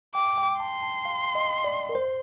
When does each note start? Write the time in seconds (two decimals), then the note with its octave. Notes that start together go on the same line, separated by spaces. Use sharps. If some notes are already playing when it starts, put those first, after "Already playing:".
0.15 G5 D6
0.38 G5
0.60 A5 C6
0.83 A5
1.05 F5
1.35 D#5
1.64 D5
1.89 A#4
1.95 C5